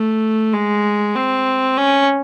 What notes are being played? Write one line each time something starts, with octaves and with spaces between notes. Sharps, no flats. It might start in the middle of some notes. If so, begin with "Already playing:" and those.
Already playing: A3
G#3
C4
C#4